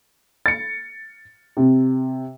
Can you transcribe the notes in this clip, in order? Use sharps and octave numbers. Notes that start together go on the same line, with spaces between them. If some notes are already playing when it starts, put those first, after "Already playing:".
A6 C#7
C3